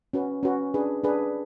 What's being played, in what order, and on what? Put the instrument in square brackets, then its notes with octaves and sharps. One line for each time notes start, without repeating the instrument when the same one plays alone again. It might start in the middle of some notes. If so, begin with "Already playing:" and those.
[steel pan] C#4 F#4 B4
C#4 F#4 B4
D4 G#4 B4
D4 G#4 B4